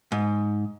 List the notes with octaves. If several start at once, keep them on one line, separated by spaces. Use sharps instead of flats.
G#2